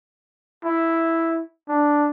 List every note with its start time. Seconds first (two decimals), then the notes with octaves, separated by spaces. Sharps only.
0.65 E4
1.69 D4